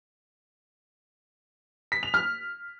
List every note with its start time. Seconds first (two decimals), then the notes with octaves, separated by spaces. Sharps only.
1.92 B6
2.03 F7
2.14 F6